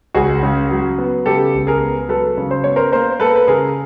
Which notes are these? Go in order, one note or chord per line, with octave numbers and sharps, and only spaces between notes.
C#2 F#4 G#4
C#3
F#3
B3
C#3 G4 A4
C#2
G#4 A#4
B3
F#3 A4 B4
C#3
C5
B3 C#5
A#4 C5
A#3 A#4 C5
A#3 A4 B4
B4
C#3 G#4 A#4